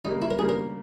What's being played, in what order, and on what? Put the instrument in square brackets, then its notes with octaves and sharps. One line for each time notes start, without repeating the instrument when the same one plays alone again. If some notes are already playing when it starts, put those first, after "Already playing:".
[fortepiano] C#3 G3 A#3 [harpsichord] D#4
[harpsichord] E4
A#4
[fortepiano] C#3 G3 A#3 [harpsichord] G#4
[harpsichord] A#4